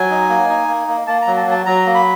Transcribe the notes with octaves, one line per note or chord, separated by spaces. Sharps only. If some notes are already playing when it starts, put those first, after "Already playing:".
Already playing: F#3 G#5
D#4
A#3
D#4
A#3
A#3
A#3 A5
A#5
F#3
A5
F#3
A5
F#3 A#5
A#3
B5